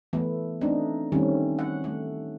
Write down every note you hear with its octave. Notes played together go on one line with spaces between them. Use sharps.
E3 A3 B3
A3 C4 D4 D#4
D#3 G3 A3 C4 C#4
F#5
A3